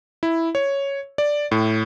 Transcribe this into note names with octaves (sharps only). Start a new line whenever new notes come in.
E4
C#5
D5
A2